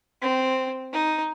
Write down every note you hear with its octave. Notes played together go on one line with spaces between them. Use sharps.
C4
D#4